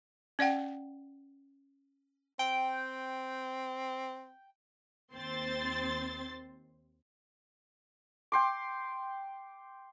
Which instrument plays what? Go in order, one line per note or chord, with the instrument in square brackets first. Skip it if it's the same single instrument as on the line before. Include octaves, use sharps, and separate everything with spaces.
[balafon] C#4 D5 F#5 G5
[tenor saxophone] C4 [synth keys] G5
[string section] D#2 C4 C5 C6 A6
[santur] G5 C6 D6